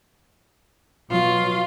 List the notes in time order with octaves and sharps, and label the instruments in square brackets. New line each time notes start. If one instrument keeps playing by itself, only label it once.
[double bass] B2 F#3 [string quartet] F4